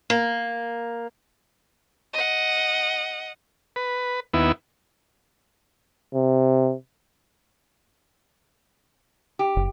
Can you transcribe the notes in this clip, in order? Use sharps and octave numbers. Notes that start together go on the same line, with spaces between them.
A#3
D#5 F#5
B4
D#2 B3 E4
C3
G4
F#1